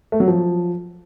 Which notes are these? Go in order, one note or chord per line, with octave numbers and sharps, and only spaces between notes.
A3
F#3
F3